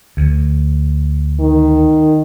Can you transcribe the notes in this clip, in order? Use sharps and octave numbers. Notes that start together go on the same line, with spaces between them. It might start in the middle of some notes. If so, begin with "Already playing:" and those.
D2
D#3